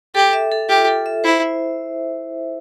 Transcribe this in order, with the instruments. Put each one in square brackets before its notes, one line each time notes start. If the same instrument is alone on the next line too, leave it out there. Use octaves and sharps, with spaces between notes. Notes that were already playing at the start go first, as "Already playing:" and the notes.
[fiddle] G4 [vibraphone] A4
[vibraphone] E5
A4
[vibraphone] F4 [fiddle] G4
[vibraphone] A4
E5
[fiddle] E4 [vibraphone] C5
[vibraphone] E4